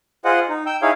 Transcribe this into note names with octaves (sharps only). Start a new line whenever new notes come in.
F4 G#4 C5 D#5 F#5
D#4
G5 E6 G6
D#4 E4 G#4 C#5 F5